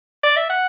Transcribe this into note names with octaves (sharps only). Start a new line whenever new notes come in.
D5
E5
F#5